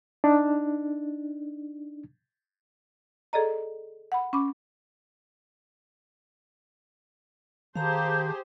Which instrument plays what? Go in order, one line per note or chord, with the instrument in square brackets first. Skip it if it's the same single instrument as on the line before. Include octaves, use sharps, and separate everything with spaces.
[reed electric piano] D4 D#4
[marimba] G#4 A4 D5 D#5 A#5
F#5 B5
C#4 B5 D6
[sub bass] D#3 [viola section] G4 G#4 C5 [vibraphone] F5 A#5 [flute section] A5 G6